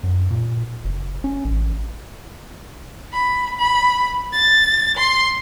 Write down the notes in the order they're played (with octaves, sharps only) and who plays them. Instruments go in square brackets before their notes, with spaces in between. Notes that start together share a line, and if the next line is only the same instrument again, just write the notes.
[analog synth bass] F#2
A#2
F#1
C#4
A1
[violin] B5
B5
A6
C6